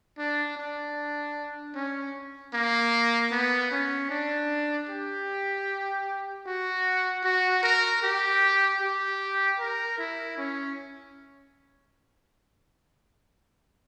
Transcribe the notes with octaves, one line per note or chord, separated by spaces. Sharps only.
D4
D4
C#4
A#3
B3
C#4
D4
G4
F#4
F#4
A#4
G4
G4
A#4
E4
C#4